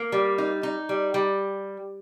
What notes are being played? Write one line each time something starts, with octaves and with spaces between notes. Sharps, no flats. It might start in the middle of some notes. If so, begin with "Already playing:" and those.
Already playing: A#3
G3
D#4
D#4
G3
G3